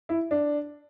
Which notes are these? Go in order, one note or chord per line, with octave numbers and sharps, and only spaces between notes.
E4
D4